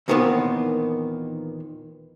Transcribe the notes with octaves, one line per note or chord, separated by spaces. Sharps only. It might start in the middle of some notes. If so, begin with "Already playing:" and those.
D#2 A#2 D#3 E3 B3 C4